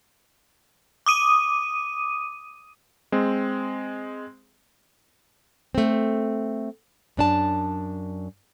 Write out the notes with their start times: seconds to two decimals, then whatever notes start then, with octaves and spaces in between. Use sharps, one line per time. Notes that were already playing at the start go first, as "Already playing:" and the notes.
1.06 D6 D#6 D#7
3.12 G#3 C4
5.75 A3 C4
7.17 F#2 D4 A5